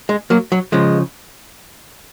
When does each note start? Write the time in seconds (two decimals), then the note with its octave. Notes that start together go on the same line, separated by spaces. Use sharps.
0.09 G#3
0.30 F#3 A#3
0.52 F#3
0.72 C#3 F3 G#3